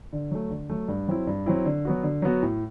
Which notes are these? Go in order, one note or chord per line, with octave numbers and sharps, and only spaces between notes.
D3
F#3 A3
D3
F#3 A3
G2
F#3 C4 E4
G2
F#3 C4 E4
D3
F#3 B3 F#4
D3
F#3 B3 F#4
A2